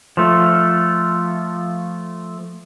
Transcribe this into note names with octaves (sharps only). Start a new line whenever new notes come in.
F3 A3